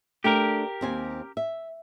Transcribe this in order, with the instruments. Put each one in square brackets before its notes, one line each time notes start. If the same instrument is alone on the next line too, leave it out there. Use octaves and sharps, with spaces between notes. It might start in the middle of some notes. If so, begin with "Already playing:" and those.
[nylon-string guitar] A3 D4 G5 [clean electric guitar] G4 A#4
[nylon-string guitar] D#2 C4 G#5
E5